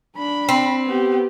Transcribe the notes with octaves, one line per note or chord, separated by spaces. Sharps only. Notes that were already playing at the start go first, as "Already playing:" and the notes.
D4 B5
C4
B3 G4